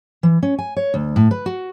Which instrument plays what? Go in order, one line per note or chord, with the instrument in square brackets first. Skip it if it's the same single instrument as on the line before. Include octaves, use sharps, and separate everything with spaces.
[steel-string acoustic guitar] E3
C#4
G#5
C#5
D2
A2
B4
F#4